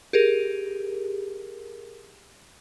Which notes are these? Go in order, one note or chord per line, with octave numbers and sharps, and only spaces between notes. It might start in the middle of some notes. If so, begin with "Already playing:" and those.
G4 G#4 A#4